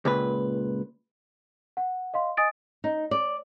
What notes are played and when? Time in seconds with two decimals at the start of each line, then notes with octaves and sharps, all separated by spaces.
0.05 C#2 A#2 B4
1.77 F#5
2.14 D#5 F5 C6
2.37 D#5 G#5 D#6 A6 D7
2.84 D#4
3.11 D5